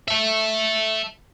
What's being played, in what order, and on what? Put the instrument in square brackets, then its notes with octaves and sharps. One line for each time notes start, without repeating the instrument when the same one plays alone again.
[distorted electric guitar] E5 A5